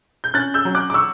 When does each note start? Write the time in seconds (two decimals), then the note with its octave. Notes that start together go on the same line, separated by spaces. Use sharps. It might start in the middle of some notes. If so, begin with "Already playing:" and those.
0.24 G6
0.34 C#4 F#6 A6
0.54 E6 G6
0.65 F#3
0.75 D6 F#6
0.90 D6
0.94 C#6 E6